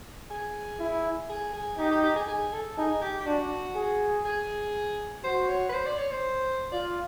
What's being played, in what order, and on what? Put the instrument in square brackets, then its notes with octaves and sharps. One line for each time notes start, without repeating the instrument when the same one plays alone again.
[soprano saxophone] G#4
[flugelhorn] E4
[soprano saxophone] G#4
G#4
[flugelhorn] D#4 [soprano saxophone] G4
[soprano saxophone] G4
G4
G#4
G#4
A4
[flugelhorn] D#4 [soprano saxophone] G#4
[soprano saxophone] G4
G4
[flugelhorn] D4 [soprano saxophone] F#4
[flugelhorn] G#4
[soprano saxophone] G#4
[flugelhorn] F#4 [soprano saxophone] C5
[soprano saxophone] C#5
B4
C5
D5
C#5
C5
[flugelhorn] F4 [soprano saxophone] D5